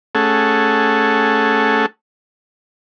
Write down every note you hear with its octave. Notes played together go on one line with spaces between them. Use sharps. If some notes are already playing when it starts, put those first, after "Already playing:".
A3 C#4 G#4 A4 F#5